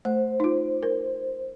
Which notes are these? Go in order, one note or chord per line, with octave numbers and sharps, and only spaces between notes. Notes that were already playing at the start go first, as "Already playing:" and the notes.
A3 C5
D#4 F4
A#4